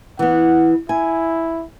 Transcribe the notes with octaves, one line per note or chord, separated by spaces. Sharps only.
E3 B3 F#5
E4 G#5